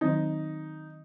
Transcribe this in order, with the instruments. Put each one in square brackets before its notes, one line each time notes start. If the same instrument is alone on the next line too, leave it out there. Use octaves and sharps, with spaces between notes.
[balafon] D#3 F#3 C4 [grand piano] D#4